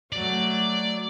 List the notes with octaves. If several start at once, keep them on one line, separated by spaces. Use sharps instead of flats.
F#3 A3 D5